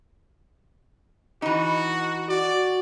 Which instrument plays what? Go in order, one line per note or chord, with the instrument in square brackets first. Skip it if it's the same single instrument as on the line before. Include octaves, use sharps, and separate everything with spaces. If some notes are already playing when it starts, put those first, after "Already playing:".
[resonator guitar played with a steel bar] E3 D#4 [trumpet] F#4
[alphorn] F#4 [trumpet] D5